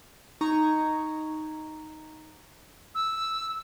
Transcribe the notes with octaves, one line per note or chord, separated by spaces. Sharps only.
D#4 A#5 C#6 G#6
E6